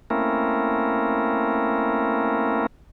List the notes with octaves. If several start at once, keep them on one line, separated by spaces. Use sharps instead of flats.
A3 A#3 C4 C#4 E4 A#4